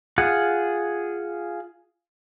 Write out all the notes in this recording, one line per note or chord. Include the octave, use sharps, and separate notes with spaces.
F4 G#4 F#5